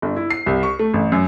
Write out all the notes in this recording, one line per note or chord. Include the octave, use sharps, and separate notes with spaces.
G1
E4
C7
C2
C#6
A3
A1
F#2